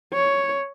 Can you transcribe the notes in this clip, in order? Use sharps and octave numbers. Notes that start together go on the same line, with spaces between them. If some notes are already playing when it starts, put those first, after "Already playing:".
C#5